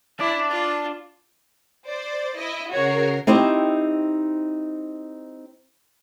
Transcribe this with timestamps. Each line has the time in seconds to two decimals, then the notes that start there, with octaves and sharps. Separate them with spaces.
0.20 D4 E4 D5
0.51 F4
1.88 C5 D5
2.40 E4 D#5
2.72 C#3 F#4 A#4 C#5 C7
3.27 C4 D#4 E4 G4 C5 D#5